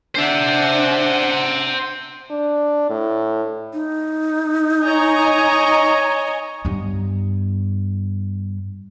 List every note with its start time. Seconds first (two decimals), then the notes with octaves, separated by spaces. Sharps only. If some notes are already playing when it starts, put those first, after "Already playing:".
0.15 D4 C5 E5 F#5
2.31 D4
2.90 A2
3.73 D#4
4.85 C#5 D#5 G#5 A#5
6.65 G2 B3